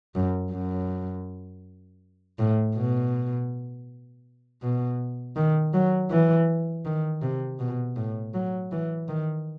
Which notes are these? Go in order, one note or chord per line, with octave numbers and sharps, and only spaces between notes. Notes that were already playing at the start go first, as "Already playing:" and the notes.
F#2
F#2
A2
B2
B2
D#3
F#3
E3
D#3
C3
B2
A2
F#3
E3
D#3